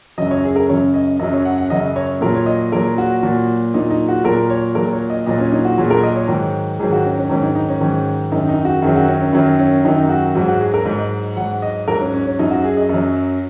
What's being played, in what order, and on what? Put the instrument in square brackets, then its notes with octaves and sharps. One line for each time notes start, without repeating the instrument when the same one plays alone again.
[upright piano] F#2 C#3 F#3 D#5
C#5
G#4
A#4
F#2 C#3 F#3 C#5
D#5
F#2 C#3 F#3 D#5
C#5
F#5
F#5
F#2 C#3 F#3 D#5
C#5
A#2 F#3 A#4
C#5
D#5
A#2 F#3 A#4
F#4
A#2 F#3
A#2 F#3 D#4
D#4
F#4
A#2 F#3 A#4
C#5
A#2 F#3 A#4
C#5
D#5
A#2 F#3 D#5
C#4
D#4
F#4
A#2 F#3 G#4
A#4
D#5
C#5
G#2 D#3 F#3
G#2 D#3 F#3 G#4
F#4
C#4
C#4
G#2 D#3 F#3 C#4
D#4
D#4
C#4
G#2 D#3 F#3
F#2 D#3 F#3 D#4
D#4
F#4
F#2 D#3 F#3 G#4
F#4
C#4
C#4
F#2 D#3 F#3
C#4
F#2 D#3 F#3 D#4
F#4
G#2 F#3 F#4
F#4
G#4
A#4
G#2 F#3 A#4
D#5
G#2 F#3 F#5
D#5
G#2 F#3 A#4
C#4
C#4
C#4
F#2 F#3 D#4
F#4
G#4
D#5
F#2 F#3